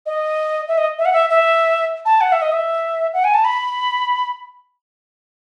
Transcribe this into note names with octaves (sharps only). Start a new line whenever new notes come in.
D#5
E5
D#5
E5
F#5
E5
E5
A5
F#5
E5
D#5
E5
F#5
G#5
A5
B5